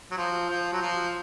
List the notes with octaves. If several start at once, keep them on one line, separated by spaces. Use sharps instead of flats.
F#3
F3
F3
F#3
F3